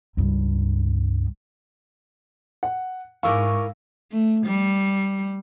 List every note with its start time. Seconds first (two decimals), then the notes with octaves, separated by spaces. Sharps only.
0.17 C#2 G2
2.63 F#5
3.23 G#2 E4 A#4 F5 G#5 C#6 D6 E6
4.12 A3
4.46 G3